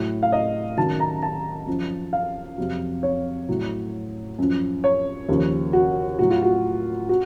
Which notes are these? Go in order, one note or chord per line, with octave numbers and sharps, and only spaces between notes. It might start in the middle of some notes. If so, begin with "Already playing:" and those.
Already playing: A2 F#3
F5
D#5
F#2 D#3 F#3 A5
A#5
A5
F#2 F3
F5
F2 C3 F#3
C#5
A2 F#3
F#2 F3
C#5
D#2 C#3 F3
F#4
A2 F#3 F#4
F4
F#4
F#4